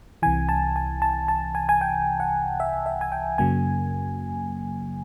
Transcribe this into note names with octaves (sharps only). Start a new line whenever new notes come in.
C2 C3 E3 G#5
A5
G#5
A5
A5
G#5
G#5
G5
F#5
E5
E5
G#5
G5
F#2 C#3 F#3 A#3 G#5